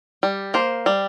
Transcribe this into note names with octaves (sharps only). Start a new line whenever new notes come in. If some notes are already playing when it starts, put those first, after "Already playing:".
G3
A#3 C5
G3